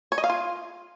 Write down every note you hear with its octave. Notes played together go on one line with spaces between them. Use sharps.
C#5
D#5
F5
F4